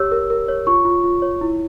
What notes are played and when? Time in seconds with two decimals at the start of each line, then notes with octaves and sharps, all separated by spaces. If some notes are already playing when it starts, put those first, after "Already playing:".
Already playing: G4 C#5 E6
0.12 A#4
0.30 A#4
0.48 C#5
0.67 F4 C#6
0.85 F4
1.04 F4
1.22 C#5
1.41 E4